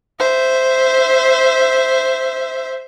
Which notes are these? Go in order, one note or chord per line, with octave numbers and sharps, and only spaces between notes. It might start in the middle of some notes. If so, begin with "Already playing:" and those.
C5 E5